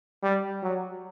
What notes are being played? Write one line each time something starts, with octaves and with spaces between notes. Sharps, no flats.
G3
F#3